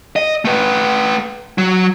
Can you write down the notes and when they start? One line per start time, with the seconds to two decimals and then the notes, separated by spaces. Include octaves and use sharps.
0.16 D#5
0.45 A3 B4
1.58 F#3